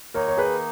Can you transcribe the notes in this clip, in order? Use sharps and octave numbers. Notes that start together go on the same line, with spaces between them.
D#3 A#3 D#4 A#4 C#5
C#5
G#4 B4